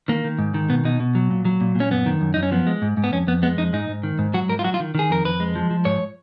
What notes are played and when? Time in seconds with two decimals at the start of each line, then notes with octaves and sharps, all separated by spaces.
0.08 D#3 A#3
0.24 D#3
0.39 G#2
0.54 D#3
0.69 B2 B3
0.85 B2 D#4
1.00 B2
1.15 F#3
1.31 A#2
1.45 F#3
1.61 A#2
1.76 A#2 C#4
1.91 F#2 B3
2.06 D#3
2.21 F#2
2.34 F#2 D#4
2.43 C#4
2.52 F3 B3
2.67 G#3
2.82 G#2
2.97 G#2
3.04 B3
3.13 F2 C#4
3.27 F2 B3
3.43 G#3 B3
3.58 F2 D#4
3.73 G#2 D#4
3.88 G#2
4.03 D#3
4.19 G#2
4.34 F#3 F#4
4.49 G#2 A#4
4.59 F4
4.64 F#3 F#4
4.74 F4
4.80 D#3
4.95 D#3 G#4
5.10 F2 A#4
5.25 F2 B4
5.40 G#3
5.56 F3
5.71 F3
5.85 G#2 C#5